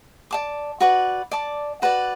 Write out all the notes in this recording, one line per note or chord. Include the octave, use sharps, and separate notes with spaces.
D5 A5 D6
F#4 B4 D5
D5 A5 D6
F#4 B4 D5